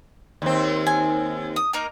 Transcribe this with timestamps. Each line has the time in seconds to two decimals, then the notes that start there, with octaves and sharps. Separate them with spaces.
0.42 D#2 C4
0.87 G#5
1.56 D#6
1.73 A#3 D#4 A#4